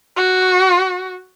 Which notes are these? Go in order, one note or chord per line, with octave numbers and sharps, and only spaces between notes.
F#4